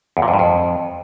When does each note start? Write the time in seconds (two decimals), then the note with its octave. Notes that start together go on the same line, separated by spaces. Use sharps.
0.17 E2
0.22 A#2
0.28 F2
0.34 G2
0.39 F2